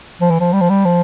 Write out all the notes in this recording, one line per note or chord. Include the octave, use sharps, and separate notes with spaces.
F3
E3
F3
G3
F3
G3
F3